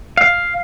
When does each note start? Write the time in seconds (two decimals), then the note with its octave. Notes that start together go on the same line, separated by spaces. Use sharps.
0.17 F5